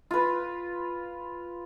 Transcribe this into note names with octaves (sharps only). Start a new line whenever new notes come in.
F4 B4